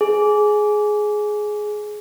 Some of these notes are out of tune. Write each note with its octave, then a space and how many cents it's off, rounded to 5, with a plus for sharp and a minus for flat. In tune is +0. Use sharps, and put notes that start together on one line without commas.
G#4 +15